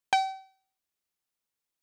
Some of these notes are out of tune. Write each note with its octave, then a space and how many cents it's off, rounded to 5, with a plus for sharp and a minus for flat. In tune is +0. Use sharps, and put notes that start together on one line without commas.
G5 -40